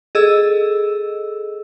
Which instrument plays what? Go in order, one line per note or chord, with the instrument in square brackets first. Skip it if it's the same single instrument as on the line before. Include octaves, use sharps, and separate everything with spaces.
[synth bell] G#4 A4 D#5 E6